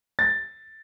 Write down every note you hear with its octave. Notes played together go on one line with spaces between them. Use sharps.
A6